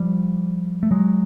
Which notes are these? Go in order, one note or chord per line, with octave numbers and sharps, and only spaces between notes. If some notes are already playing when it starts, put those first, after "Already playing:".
Already playing: F3 G3
A3
F#3 G#3